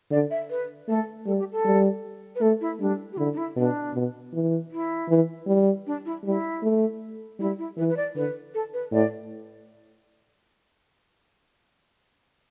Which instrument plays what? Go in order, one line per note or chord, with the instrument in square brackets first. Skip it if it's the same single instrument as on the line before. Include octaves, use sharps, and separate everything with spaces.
[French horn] D3 [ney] D5
[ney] E5
B4
[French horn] A3 [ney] A4
[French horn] G3 [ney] A4
[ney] G4
A4
[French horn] G3
[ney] B4
[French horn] A3 [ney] A4
[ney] E4
[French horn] G3 [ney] D4
[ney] G4
[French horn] D3 [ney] E4
[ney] D4
E4
[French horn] B2 [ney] D4
[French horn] B2
E3
[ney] E4
[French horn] E3
G3
[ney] D4
E4
[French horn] G3 [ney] E4
[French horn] A3
[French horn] G3 [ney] E4
[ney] E4
[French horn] E3 [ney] B4
[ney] B4
D5
[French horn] D3 [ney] B4
[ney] A4
B4
[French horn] A2 [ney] D5